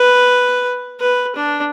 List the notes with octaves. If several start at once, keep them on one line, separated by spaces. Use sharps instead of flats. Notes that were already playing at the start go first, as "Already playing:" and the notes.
Already playing: B4
B4
D4